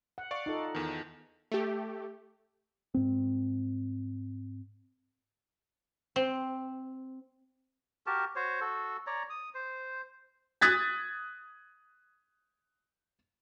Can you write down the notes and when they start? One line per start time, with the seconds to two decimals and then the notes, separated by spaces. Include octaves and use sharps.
0.18 F#5
0.31 D5 F5 C#6
0.46 D#4 F4 A4
0.75 E2 D#3
1.52 A3 G4
2.94 G#2 C4
6.16 C4
8.07 F#4 G4 A#4 A5
8.36 F#4 C5 C#5
8.61 F#4 A4
9.07 C#5 D5 A#5
9.30 D#6
9.55 C5
10.61 D#6 F#6 G#6 A6 B6